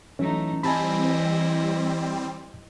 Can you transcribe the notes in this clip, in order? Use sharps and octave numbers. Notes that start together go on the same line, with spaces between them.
E3 F#3 A3 C#4 D#4
G3 C4 E4 D#5 G#5 A5 B5